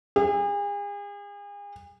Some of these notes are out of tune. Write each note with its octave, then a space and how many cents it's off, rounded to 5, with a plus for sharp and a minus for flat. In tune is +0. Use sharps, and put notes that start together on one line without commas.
G#4 -40